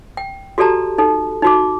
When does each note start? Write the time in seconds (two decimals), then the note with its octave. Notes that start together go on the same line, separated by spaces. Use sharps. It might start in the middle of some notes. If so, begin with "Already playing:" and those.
0.17 G5
0.58 F#4 G4 A4 D5 A5 A#5
0.98 D#4 A4
1.42 D#4 F#4 D6